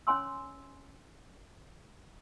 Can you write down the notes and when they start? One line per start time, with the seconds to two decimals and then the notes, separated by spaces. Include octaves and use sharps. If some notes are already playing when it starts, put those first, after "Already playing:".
0.07 C#4 C#5 G#5 C6 E6